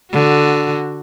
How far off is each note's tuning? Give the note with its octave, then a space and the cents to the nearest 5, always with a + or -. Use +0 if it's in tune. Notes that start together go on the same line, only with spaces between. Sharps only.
D3 +0 F#4 +0